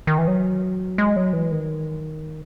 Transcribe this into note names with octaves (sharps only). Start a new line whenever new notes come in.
D#3
E3
F#3
G#3
F#3
E3
D#3